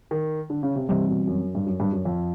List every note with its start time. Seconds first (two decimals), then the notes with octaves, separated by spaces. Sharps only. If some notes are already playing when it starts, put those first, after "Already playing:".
0.11 D#3
0.50 D3
0.63 C#3
0.76 C3
0.89 C3 E3 G3 C4
1.08 B2
1.27 F#2
1.55 G2
1.66 F#2
1.80 G2
1.92 F#2
2.05 F2